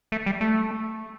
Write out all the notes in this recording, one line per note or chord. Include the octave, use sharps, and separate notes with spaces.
A3
G3
A3